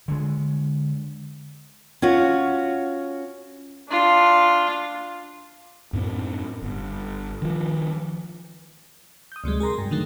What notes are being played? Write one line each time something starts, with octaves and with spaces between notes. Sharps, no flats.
D3 G#3
C#4 F4 F#4 C#5
D4 F4
F#2 A2 B3 C4
G1
D#3 F3
D#6 G6
D2 C3 F#3 G#3
G#4 A#4 A#5 C6
G2
D3 D#3 F#3 A3